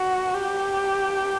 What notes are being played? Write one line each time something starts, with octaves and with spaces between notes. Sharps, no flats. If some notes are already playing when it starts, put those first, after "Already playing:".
Already playing: F#4
G4